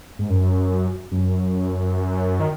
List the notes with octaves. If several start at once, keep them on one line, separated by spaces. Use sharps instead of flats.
G#2
F#2
F#2
D#3